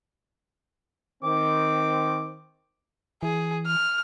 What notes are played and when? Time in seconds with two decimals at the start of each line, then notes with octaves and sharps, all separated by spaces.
1.23 D#3 C4 D6
3.23 E3 G#4
3.66 F6